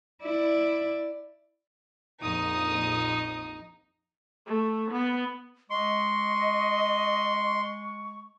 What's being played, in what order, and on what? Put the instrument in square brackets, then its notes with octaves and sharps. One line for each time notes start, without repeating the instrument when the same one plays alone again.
[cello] E4 D5
[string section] A#1 F2 D#6 [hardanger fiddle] D#4
[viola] A3
B3
[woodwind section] G#3 C#6 [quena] D#5 [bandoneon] C6